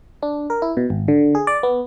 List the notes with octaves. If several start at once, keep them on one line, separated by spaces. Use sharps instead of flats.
D4
A#4
E4
B2
G#1
D3
G#4
D5
B3